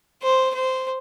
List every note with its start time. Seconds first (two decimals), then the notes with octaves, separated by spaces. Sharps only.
0.22 C5
0.55 C5